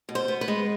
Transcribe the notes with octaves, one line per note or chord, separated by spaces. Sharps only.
B2
C5
B3
B4
G#3